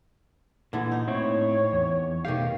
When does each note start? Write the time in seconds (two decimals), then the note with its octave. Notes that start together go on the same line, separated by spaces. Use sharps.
0.73 A#2 D3 E3 B3
0.92 D#4
1.08 A2 C4 E4 C#5
1.73 E2
2.25 B2 D#3 A3 G4 F5